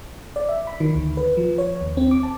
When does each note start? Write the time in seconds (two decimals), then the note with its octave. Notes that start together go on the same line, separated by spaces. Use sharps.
0.36 D5
0.49 E5
0.67 B5
0.80 D#3
0.95 D2
1.17 B4
1.37 F3
1.58 C#5
1.81 D#2
1.97 C4
2.11 D6
2.23 A5